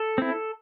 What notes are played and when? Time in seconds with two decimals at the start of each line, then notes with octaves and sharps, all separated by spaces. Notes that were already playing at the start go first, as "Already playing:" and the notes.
Already playing: A4
0.18 C4 E4